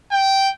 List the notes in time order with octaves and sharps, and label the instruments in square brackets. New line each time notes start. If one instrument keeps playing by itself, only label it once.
[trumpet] G5